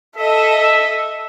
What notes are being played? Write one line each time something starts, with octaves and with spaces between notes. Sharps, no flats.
A4 D#5 E5